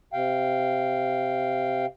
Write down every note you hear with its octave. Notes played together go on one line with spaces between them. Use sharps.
C3 F5 G5